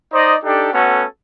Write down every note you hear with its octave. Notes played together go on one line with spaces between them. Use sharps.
D#4 C5 D5 D#5
D4 D#4 G4 A4 G5
A3 B3 C#4 F#4 A4